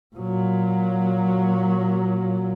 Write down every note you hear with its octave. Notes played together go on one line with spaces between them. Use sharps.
A#2 F#3